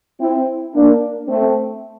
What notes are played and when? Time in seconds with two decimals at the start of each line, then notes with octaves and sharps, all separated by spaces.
0.20 C4 E4
0.74 A#3 D4
1.27 A3 C4